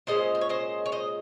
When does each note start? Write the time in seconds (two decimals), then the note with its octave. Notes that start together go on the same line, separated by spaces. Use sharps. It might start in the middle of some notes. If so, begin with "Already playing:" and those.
0.07 A#2 G#3 C#4 C5 D#5
0.35 C5
0.41 C#5
0.49 C5 D#5
0.86 C#5
0.92 C5 D#5